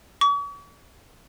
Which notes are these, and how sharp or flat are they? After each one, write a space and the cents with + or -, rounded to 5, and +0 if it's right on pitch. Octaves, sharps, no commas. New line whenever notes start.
C#6 +45